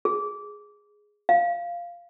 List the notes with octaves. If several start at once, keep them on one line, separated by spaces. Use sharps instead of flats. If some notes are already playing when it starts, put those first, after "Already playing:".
G#4
F5